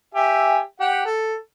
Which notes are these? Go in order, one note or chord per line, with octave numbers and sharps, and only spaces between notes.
G4 E5 G#5
G4 F#5
A4